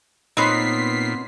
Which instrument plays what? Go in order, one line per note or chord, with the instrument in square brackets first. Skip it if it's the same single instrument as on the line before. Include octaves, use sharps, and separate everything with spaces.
[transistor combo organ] A#2 [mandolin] B3 C4 [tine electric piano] D#4 C#5 [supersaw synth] B6 C7